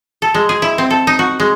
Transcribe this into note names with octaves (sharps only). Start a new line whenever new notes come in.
A4
G#3
G#4
E4
C4
A4
D#4
F#4
G#3